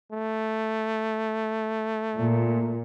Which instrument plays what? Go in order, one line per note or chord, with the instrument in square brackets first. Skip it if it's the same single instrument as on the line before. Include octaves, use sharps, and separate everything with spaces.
[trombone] A3
[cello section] A#2